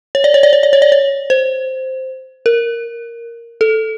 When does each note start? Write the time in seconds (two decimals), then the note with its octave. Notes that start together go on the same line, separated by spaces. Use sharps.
0.15 C#5
0.24 D5
0.34 C#5
0.43 D5
0.53 C#5
0.63 D5
0.73 C#5
0.82 D5
0.92 C#5
1.30 C5
2.46 A#4
3.61 A4